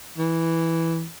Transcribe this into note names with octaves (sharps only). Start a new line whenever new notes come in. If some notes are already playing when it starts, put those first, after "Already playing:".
E3